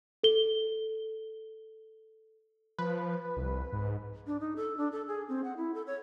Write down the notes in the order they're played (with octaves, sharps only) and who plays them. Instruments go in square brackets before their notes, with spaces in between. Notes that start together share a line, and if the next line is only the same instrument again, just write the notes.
[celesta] A4 G7
[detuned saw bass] F3 [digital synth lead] B4
[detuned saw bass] C2
G#2
[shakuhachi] D4
D#4
A4
D4
A4
G#4
C4
F#5
E4
A4
C#5